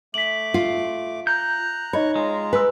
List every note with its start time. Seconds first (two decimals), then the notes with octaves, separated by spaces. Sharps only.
0.14 A3 D6 B6 F#7
0.54 F4
1.27 A#5 F#6 G6
1.93 D#4 C#5 D#5 B5
2.16 G#3 F4 A#5
2.53 B4 G#5 E6